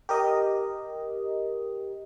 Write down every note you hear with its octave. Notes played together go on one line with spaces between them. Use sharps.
G4 A#4 D#5